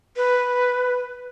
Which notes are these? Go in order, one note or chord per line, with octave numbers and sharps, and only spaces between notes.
B4